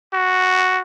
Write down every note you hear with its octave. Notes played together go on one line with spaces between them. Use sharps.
F#4